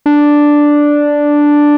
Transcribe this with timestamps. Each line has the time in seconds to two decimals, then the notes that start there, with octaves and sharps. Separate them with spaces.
0.06 D4